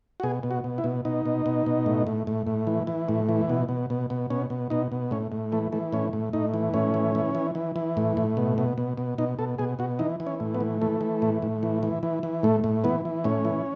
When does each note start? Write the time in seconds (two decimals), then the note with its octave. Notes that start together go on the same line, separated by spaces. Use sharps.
0.20 F#4
0.23 B2 G#4
0.43 B2
0.51 F#4
0.64 B2
0.78 E4
0.84 B2
1.05 B2 D#4
1.26 B2
1.46 B2
1.66 B2
1.86 A2
2.07 A2
2.27 A2
2.47 A2
2.67 E3
2.87 E3
3.09 A2
3.29 E3
3.49 B2
3.69 B2
3.90 B2
4.10 B2
4.30 B2 C#4
4.50 B2
4.70 B2 D#4
4.92 B2
5.11 A2 C#4
5.32 A2
5.52 E3 A3
5.72 E3 A3
5.93 A2 C#4
6.13 A2
6.33 A2 D#4
6.54 E3
6.74 A2 C#4
6.94 E3
7.15 E3
7.35 E3
7.55 E3
7.76 E3
7.97 A2
8.17 A2
8.37 B2
8.58 B2
8.78 B2
8.97 B2
9.18 B2 D#4
9.39 B2 A4
9.58 B2 G#4
9.79 B2 F#4
9.99 E3 D#4
10.20 E3
10.27 C#4
10.40 A2
10.54 B3
10.61 E3
10.82 E3 A3
11.01 E3
11.22 A2
11.42 A2
11.63 E3
11.83 E3
12.03 E3
12.23 E3
12.43 A2 A3
12.64 A2
12.84 E3 B3
13.05 E3
13.24 A2 C#4
13.45 E3